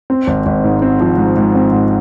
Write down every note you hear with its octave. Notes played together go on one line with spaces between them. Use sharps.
C4
G#1
G#1
G#2
C4
F3
G#2
G#2
C4
G#2